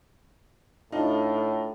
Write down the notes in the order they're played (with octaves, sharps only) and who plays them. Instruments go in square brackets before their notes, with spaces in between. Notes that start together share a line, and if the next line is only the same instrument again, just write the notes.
[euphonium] A2 [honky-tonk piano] D4 D#4 F4